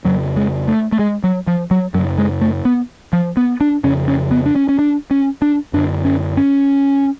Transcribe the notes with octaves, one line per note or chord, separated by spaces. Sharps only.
F2 C#3 F#3
G#3
A3
A3
G#3
F#3
F3
F#3
F#2 C#3 F#3
G#3
A3
B3
F3
B3
D4
F2 C#3 C#4
C#4
B3
D4
C#4
C#4
D4
C#4
D4
F#2 D3 D4
C#4
C#4